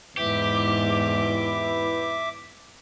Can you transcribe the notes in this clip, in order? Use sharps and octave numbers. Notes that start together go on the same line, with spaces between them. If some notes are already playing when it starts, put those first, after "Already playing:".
E2 G#2 E4 G4 B4 E5 D6